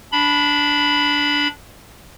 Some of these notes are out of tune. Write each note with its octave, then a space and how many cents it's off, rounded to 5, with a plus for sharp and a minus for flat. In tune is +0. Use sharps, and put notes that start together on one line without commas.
D4 -10 B5 +0